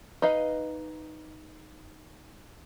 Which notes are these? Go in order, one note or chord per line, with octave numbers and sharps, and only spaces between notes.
D#4 B4 D#5 F5